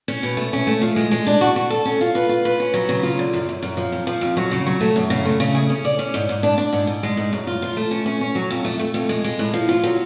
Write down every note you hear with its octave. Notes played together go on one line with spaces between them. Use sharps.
C#4
B2
A3
C#4
A3
F3
G#3
G#3
D4
F#4
F#4
A4
C#4
F4
B4
F4
B4
C#4
F#3
C#3
F4
D3
F#2
F#2
F#2
F3
F2
F3
F2
F#3
C#3
F#3
A3
F#2
C#3
A3
C#3
G#4
C#4
D5
C#4
G#2
G#2
D4
D4
G#2
G#2
G#3
G#2
F#2
F4
F3
A3
C#4
C#4
C#4
F#3
F2
A3
A3
F2
G#3
G#3
A2
F3
F4
F#3